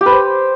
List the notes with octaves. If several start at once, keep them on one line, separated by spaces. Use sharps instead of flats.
G4
B4
C5